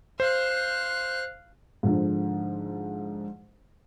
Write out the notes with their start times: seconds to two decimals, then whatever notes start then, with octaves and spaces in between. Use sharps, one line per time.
0.20 C5 F5 F#6
1.83 G#2 D3 F3